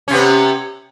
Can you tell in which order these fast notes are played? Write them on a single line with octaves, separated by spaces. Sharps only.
C#4 C3 B3